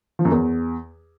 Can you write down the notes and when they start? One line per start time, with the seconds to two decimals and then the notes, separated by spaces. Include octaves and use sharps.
0.19 F3
0.25 F#2
0.31 E2